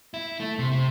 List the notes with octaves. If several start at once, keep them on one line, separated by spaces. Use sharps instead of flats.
E4
A3
C3
C3